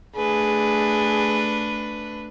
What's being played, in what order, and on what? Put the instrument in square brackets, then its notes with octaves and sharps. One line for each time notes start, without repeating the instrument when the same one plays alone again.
[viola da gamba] A3 D4 B4 [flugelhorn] G#4